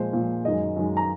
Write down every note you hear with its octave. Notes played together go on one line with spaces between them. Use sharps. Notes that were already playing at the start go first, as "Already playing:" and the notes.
Already playing: A#2 F3 G#3 C5
A#2 F3 G#3
F#2 D#3 G#3 D#5
F#2 D#3 G#3
A#5